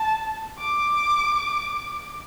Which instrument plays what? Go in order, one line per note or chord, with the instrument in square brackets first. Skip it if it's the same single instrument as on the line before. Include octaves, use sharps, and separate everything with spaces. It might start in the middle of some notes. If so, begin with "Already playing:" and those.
Already playing: [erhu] A5
D6